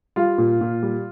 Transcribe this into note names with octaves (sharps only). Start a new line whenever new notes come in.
G3 F4 F5
A#2
A#2
G3